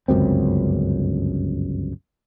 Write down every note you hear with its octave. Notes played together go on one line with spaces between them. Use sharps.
G1 C#2 F#2 C4